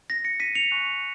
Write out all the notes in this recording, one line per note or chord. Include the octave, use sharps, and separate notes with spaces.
A#6
A#6 C#7
B6 D#7
C#7 F7
G#5 C#6 F#6